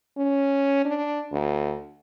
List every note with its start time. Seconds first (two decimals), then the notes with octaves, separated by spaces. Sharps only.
0.17 C#4
0.85 D4
1.32 D2